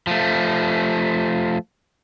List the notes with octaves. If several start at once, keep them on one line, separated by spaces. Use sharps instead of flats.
F3 A3